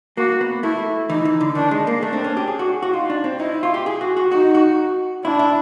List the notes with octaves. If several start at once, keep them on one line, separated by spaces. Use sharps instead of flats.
A#3 F#4
B3
A3 E4
E3 D#4
E3
D3
D#3 D4
G#3
A#3
A3 D4
C4
C#4
G4
G#4
F#4
F#4
D#4 F4
D4
C4
D#4 E4
F4
G4
G#4
F#4
F#4
D#4 F#4
F#4
D4 E4
E4